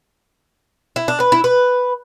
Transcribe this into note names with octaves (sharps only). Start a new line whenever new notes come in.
E4
D4
B4
E4
B4